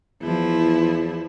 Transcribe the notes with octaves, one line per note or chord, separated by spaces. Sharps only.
E2 F3 E4